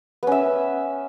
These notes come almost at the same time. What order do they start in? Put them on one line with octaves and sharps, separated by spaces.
B3 C#4 E5